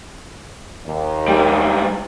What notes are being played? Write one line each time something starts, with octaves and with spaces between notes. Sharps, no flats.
D#2
G#2 G3